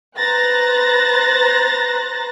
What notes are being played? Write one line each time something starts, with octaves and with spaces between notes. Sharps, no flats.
B4 C5 A#5 F#6 A6 A#6